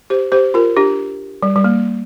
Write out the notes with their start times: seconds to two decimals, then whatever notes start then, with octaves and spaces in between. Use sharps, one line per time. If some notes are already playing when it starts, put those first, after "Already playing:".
0.10 G4 C5
0.32 G4 C5
0.54 F4 A#4
0.77 D4 G4
1.43 G3
1.56 G3
1.64 A#3